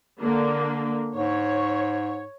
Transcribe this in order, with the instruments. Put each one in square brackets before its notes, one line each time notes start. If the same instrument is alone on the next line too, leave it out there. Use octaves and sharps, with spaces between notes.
[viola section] D3 A#3
[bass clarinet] G#2 [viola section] C#5